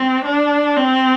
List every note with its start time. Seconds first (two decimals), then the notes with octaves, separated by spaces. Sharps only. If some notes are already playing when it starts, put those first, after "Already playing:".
Already playing: C4
0.25 D4
0.77 C4